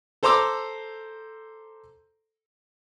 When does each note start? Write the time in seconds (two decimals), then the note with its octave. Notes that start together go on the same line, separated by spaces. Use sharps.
0.23 A4 C5 A#5 C6 D6 E6